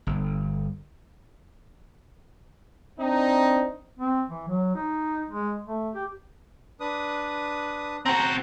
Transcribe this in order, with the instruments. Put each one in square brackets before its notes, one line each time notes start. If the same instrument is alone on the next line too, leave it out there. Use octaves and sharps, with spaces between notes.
[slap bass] G1
[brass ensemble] C4 D4 D#4
[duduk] C4
E3
F#3
D#4
G#3
A3
G4
[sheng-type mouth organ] D4 B4 D#6
[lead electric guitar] C4 F#4 [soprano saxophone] A#5 [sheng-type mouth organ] F#6 G6